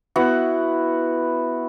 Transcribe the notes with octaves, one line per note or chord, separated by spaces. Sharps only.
B3 E4 F#4 F#5